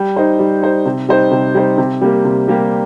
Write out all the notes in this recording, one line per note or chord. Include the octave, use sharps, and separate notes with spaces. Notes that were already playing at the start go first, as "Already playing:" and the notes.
Already playing: G3
D#4 C5
G3
D#4 C5
C3
G3 D#4 C5
C3
G3 D#4 C5
C3
G3 A#3 G4
C3
G3 A#3 G4